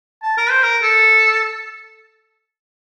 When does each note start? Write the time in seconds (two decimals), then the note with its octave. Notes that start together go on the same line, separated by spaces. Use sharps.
0.23 A5
0.38 A#4
0.51 C5
0.63 A#4
0.82 A4